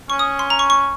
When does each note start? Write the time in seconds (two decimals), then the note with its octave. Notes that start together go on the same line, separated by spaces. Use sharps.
0.10 C#4 C#6
0.19 D#6
0.39 C6
0.50 A#5
0.59 C#6
0.70 C#6